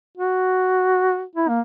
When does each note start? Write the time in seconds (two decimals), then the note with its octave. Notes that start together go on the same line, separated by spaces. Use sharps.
0.17 F#4
1.35 E4
1.49 A#3